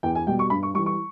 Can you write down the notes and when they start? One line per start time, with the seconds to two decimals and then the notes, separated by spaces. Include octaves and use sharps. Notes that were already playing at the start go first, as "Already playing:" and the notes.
0.03 E2 G5
0.15 G#5
0.27 B2 G3 G5
0.39 C#6
0.50 G2 B5
0.63 C#6
0.74 G3 C#6
0.77 E3
0.86 C#6